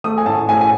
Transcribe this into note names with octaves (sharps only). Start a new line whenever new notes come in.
A3 D#6
G#5
A2 A5
A2 G#5
G#5